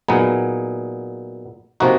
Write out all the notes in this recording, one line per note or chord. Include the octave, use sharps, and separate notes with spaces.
A#2 F#3 B3 D#4 G#4
C3 F3 A#3 D#4 F#4